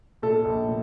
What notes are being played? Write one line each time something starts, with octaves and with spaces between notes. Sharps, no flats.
A#2 A4
A#1
A#2